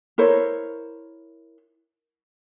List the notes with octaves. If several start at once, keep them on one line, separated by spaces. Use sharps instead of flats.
E4 A#4 C5 C#5